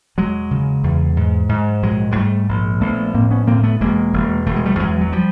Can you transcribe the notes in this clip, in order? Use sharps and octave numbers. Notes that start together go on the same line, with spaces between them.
E1 F#3 G#3
C#3
E2
G#2
G#2
A#1 F#3 G#3
G#3
G#2 G3 A3
A#1
A#1 A3 B3
A2 A#3 C4
B3 C#4
A2 A#3 C4
A#3
A3 B3
E1 G#3 A#3
E1
E1 A3
G#3
G3 A3
E2 F#3 G#3
F#3
F3 G3